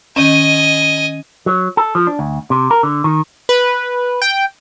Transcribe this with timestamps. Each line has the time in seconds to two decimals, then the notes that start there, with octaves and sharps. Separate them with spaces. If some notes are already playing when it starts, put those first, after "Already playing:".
0.16 D#3 C#4 D#5 G#5
1.46 F#3
1.77 A4
1.95 F3
2.07 D4
2.19 D2
2.50 C3
2.71 A#4
2.83 D3
3.04 D#3
3.49 B4
4.22 G5